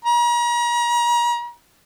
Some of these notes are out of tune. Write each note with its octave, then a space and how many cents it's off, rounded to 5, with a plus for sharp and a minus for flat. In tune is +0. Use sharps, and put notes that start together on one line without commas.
A#5 +40